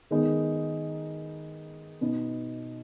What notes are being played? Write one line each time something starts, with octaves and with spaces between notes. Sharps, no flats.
D#3 G#3 B3 D#4
B2 B3 D#4